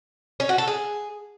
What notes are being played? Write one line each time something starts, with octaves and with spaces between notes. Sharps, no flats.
C#4
F#4
A4
G#4